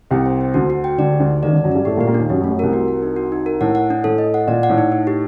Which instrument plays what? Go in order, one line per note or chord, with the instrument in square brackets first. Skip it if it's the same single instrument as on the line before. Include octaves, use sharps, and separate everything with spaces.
[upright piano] C2 C3 [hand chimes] G5
[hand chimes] C5
C5
[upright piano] D2 D3 [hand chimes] F#4
[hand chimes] F#4
G5
[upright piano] D2 D3 [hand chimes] D5
[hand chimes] G4
[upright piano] D2 D3
[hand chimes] D#4
[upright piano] D#2 D#3 [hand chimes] D5
[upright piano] D2 D3 [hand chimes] D5
[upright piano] F#2 F#3
[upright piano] G2 G3 [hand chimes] D5
[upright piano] A2 A3 [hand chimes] G4
[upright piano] A#2 A#3
[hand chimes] G4
[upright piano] A#2 A#3
[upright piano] D#2 D#3 [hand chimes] D4
[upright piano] F#2 F#3 [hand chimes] G4
[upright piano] F#2 F#3
[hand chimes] A3
[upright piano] F#2 F#3
[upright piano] C2 C3 [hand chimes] A#4
[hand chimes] F#4
A#4
D#4
F#4
D#4
A#4
[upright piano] A2 [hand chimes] F#5
[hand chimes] F#5
D4
[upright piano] A2 [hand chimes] A4
[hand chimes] D#5
F#5
[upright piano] A#2 [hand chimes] D5
[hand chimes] F#5
[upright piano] A2
[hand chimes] D#4
D#4
G4